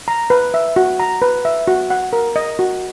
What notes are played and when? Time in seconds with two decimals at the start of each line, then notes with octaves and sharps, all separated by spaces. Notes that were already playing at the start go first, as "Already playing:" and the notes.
0.08 A#5
0.30 B4
0.54 E5
0.76 F#4
1.00 A#5
1.22 B4
1.45 E5
1.68 F#4
1.90 F#5
2.13 A#4
2.36 D#5
2.59 F#4